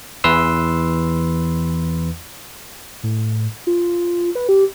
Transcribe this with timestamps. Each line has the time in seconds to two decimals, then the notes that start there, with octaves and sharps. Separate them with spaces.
0.24 E2 E3 B4 C6 E6
3.03 A2
3.67 F4
4.35 B4
4.49 G4